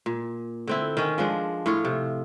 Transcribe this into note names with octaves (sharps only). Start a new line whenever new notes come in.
A#2
D3 C4 E4
D#3 C#4
F3 G#3 D4
A2 F4 C#5
C3